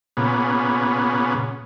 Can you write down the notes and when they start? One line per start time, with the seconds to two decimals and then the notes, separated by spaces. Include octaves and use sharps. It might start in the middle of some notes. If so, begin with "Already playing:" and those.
0.17 A#2 C#3 B3